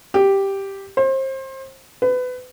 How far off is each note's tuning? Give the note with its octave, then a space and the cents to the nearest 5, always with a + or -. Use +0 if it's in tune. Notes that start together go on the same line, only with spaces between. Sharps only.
G4 +0
C5 +30
B4 +25